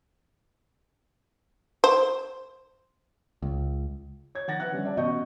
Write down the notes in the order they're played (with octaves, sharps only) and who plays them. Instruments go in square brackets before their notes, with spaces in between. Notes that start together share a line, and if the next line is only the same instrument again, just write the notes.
[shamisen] C5
[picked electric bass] C#2
[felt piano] C#5 G#6
D#3 F#5 A6 A#6
B4 E5 F#5 F#6
D3 G3 C#4
D5 E5 F#5 A5
A1 B2 D#5 C#6 G6